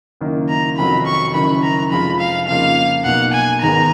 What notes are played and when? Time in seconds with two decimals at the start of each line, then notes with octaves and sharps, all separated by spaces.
0.21 F#1 F#2 D#3 A#3
0.49 A#5
0.78 F1 F2 D#3 F#3 B5
1.06 C#6
1.34 F#1 F#2 D#3 B5
1.63 A#5
1.91 F1 F2 F3 G#3 B5
2.20 F5
2.48 F2 C#3 F3 A#3 D#4 F5
3.05 B1 B2 A#3 F#5
3.33 G#5
3.62 G#1 G#2 D#3 G#3 B3 A#5